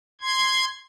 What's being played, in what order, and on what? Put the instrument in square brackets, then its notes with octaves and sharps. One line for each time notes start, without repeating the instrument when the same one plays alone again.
[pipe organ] C6 G#6